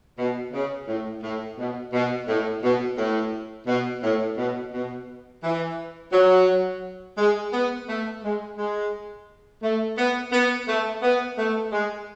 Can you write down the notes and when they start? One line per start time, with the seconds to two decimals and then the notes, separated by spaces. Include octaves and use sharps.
0.18 B2
0.53 C#3
0.88 A2
1.23 A2
1.58 B2
1.93 B2
2.28 A2
2.63 B2
2.98 A2
3.67 B2
4.03 A2
4.37 B2
4.73 B2
5.43 E3
6.13 F#3
7.18 G#3
7.52 B3
7.88 A3
8.23 G#3
8.57 G#3
9.62 A3
9.98 B3
10.32 B3
10.68 A3
11.02 B3
11.38 A3
11.72 G#3